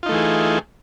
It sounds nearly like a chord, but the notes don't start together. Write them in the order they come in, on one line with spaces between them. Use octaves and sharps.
F4 D#4 A3 E3 G#4